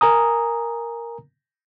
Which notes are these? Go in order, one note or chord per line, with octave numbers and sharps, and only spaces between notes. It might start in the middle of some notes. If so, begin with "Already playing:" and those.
A#4 G#5 A#5 D#6